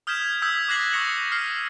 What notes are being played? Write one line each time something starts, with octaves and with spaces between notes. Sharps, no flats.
D#6 F6 G6 G#6 B6 E7
D#6 E6 G6 G#6 B6
D6 F#6 G#6 A#6 C7 F#7
C#6 D#6 A#6 C#7 F7
F6 C7